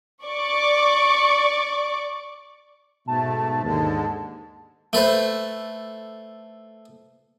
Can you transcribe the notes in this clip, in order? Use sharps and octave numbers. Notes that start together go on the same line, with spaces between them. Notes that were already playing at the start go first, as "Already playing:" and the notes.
D5 C#6 D6
G#2 B2 A3 A5
D#2 G#2 D3 G#3
A3 A4 B4 C5